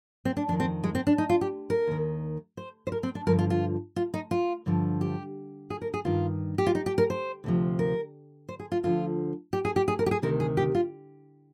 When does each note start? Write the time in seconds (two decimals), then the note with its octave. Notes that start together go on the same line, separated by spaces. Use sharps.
0.25 C4
0.37 D4
0.48 F2 D4
0.52 D#3
0.60 C4
0.84 G#3
0.95 C4
1.07 D4
1.18 D#4
1.29 F4
1.41 G4
1.70 A#4
1.87 D#2 D#3
2.57 C5
2.87 C5
2.92 A#4
3.03 C4
3.15 D4
3.27 G2 D3 F3 A#4
3.39 F4
3.50 F4
3.96 F4
4.14 D#4
4.31 F4
4.66 G2 D3 F3
5.01 G4
5.70 G#4
5.82 A#4
5.94 G#4
6.05 G2 D#3 F4
6.58 G4
6.66 F4
6.75 D#4
6.86 G4
6.98 A#4
7.10 C5
7.44 D2 C3 F3
7.79 A#4
8.49 C5
8.59 G#4
8.72 F4
8.83 D2 D3 F3 F4
9.53 G4
9.65 G#4
9.76 G4
9.88 G#4
9.99 A#4
10.06 G4
10.11 G#4
10.22 D2 C3 D#3 A#4
10.40 G#4
10.57 G4
10.75 F4